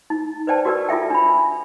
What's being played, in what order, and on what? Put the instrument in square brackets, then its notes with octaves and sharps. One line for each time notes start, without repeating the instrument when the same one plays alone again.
[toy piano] D#4
B4 C5 D5 G5 A5
F#4 G4 A#4 B4 D5
F4 A4 E5 G5
D4 B5